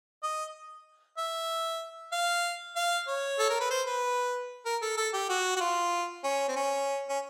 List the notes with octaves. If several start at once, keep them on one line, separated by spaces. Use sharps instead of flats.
D#5
E5
F5
F5
C#5
A4
A#4
B4
C5
B4
A#4
A4
A4
G4
F#4
F#4
F4
C#4
C4
C#4
C#4